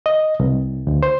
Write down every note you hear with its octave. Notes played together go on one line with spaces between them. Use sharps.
D#5
C2
D2
C5